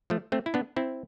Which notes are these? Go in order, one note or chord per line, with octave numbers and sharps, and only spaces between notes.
F3 A3
A3 C4
E4
B3 D4
C4 E4